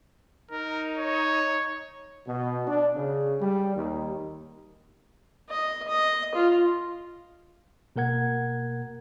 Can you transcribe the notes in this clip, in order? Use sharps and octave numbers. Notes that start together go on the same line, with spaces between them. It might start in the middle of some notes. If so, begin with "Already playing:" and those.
D#4 A#4
C#5
B2
D4
C#3
G3
D#2
D#5
D#5
F4
B2 A#3 A#4 F#5 G#6